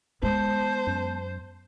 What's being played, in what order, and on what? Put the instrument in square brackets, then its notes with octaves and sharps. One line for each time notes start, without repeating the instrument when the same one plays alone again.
[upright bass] G#3 B3 [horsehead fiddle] C5 [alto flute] A5
[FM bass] F#2